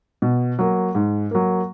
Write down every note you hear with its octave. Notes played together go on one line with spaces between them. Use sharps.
B2
F#3 A#3
G#2
F#3 A#3